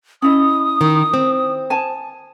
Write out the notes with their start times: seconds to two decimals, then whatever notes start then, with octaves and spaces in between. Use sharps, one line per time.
0.22 C#4 E4 D#5 D#6
0.81 D#3
1.14 C4
1.70 G#5 A5